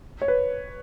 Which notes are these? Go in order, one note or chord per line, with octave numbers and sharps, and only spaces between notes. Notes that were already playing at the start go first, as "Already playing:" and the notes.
C#5
B4